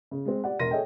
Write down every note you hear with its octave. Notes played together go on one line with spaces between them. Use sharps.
C#3
G#3 C4
G4 D5 F#5
E1 A#4 C6 A#6 D#7
G#4 A4 C#5 D#5 E5 G5